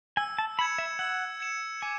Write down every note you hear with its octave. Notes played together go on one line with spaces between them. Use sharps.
G#5 E6
A5
B5 G#6 C#7 E7
E5
F#5 E6
G#6 C#7 E7
G#5 D6